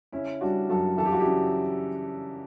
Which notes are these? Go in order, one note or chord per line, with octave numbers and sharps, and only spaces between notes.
C#3 C#4 E4
G3 D4 F#4
F#2 F#4 A4
E3 A4
G4
F#4
E4 G4
C#3